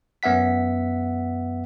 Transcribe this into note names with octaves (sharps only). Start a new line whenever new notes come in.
F#2 B3 E5 F#5 B6